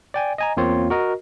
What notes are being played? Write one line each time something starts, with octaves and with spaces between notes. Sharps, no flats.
D5 G5 G#5
D#5 G#5 A#5
E2 A#3 C4 F4 C#5
F#4 A#4 D#5